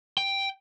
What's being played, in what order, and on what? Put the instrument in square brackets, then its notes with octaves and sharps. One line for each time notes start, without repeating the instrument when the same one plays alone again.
[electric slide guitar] G5